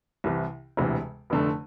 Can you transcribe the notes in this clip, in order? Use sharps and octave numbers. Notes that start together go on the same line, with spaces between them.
C2 C3 E3
E1 D2 C3 E3
F1 F2 D3 A3